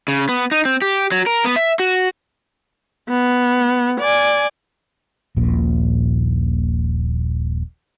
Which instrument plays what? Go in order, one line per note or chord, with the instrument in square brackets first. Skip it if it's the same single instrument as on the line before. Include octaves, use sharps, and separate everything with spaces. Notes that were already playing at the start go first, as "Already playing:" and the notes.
[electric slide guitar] C#3
B3
D#4
C4
G4
F#3
A#4
B3
E5
F#4
[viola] B3
D5 G#5
[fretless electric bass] D#1 A#1 A#2